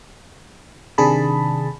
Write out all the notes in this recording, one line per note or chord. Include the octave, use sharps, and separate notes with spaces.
C3 D#3 D4 G#4 A5 B5